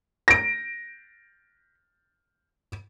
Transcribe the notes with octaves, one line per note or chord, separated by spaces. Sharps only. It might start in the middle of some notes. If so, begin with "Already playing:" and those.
A#6 D7